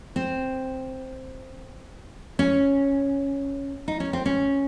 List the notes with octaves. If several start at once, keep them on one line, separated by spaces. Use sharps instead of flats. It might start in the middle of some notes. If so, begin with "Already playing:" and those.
C4
C#4
D#4
C#4
C4
C#4